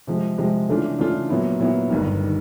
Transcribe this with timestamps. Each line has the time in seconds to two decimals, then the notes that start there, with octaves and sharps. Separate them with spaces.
0.07 C3 F3 G#3
0.38 C3 F3 G#3
0.69 C#3 E3 A3 D4 F4
0.99 C#3 E3 A3 D4 F4
1.29 A#2 F#3 B3 E4
1.60 A#2 F#3 B3 E4
1.90 G1 G2 D#3
2.24 D#3